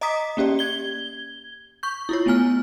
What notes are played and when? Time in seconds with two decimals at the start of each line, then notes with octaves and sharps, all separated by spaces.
0.01 D#5 A#5 D6 D#6 B6
0.37 A#3 C#4 G4 D5
0.59 G#6 G7
1.83 C#6 G6
2.09 E4 F4 C#5
2.26 A3 B3 G#5 F6